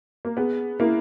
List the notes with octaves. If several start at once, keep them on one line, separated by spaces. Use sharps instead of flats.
A#3
B3 G#4
A#3 E4